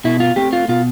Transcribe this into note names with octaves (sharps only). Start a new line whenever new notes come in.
B2 E4
F4
A3 C4 G4
F4
B2 F4